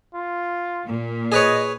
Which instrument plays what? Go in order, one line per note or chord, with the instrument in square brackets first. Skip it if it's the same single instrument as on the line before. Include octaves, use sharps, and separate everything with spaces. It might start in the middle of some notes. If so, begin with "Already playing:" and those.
[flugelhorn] F4
[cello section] A#2
[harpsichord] G#4 B4 C#5 [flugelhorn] D#5